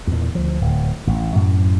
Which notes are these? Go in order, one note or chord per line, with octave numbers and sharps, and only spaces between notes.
E2 A#2
D2 F3
D1
A1
F#2 A2